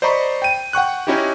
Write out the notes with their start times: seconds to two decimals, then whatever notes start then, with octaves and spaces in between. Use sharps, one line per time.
0.02 C5 D5 D#5 A#5 B5 C#6
0.42 G5 D#7
0.73 F#5 G5 C#6 F#6
1.07 C#4 D#4 E4 F#4 G4